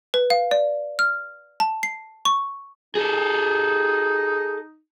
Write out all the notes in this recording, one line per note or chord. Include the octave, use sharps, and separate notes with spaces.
B4
F5
D5
F6
A5
C7
C#6
D#4 G#4 A4